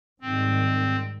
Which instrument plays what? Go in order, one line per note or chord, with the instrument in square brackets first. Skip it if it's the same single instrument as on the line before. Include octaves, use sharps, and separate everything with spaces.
[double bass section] G#2 D#3 G3 [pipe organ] C4